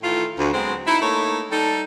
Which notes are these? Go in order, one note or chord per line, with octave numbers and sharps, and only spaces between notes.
A2 D#3 E3 F4
D2
F#3 G#3 B3 C4
D#4 E4
A3 A#3 D#4 E4 C#5
G3 D#4 A4